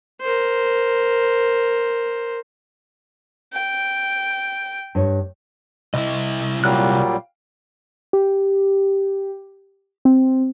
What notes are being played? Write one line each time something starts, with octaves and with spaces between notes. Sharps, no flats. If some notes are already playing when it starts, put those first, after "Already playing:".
A#4 C5
G5
G2 D4 C#5
C2 E4 D#5
A#2 F#3 G3 F5 G5 F#6
G4
C4